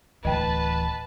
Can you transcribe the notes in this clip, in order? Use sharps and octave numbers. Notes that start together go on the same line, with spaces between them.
D1 E3 B4 D#5 G5 A5 A6